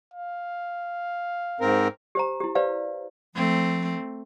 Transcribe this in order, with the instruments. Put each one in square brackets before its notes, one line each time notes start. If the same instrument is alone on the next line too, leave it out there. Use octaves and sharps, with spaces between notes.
[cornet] F5
[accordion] G#2 C4 A#4
[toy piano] G4 C5 A#5
E4 G4
G4 B4 C5 D5 F5
[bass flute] F3 [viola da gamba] A3 C4